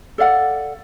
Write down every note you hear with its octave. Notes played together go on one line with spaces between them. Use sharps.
A4 D5 F5 F#5